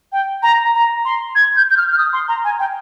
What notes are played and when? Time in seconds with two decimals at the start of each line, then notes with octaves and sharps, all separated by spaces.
0.12 G5
0.43 A#5
0.74 A#5
1.05 C6
1.35 G#6
1.57 G6
1.71 G6
1.77 F6
1.92 F6
1.98 D#6
2.13 C6
2.28 A#5
2.44 G#5
2.59 G5